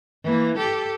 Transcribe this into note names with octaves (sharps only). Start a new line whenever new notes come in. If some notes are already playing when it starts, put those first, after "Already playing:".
E3 A#3
G4 A4